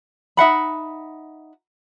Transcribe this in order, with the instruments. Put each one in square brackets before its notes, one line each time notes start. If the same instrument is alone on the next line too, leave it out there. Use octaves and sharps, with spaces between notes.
[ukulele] D#4 E5 F#5 B5